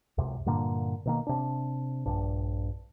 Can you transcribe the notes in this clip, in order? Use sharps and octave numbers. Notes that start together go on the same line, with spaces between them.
C#2 F#2 C3
G2 A#2 D3 A#3
B2 D#3 A#3
C3 D4
A#1 G2 D4